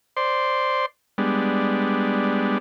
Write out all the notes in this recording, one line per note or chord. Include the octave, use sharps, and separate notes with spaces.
C5 D5 C6
G3 G#3 B3 D4